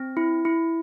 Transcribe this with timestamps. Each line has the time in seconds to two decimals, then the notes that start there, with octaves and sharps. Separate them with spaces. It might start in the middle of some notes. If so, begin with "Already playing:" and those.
Already playing: C4
0.17 E4
0.45 E4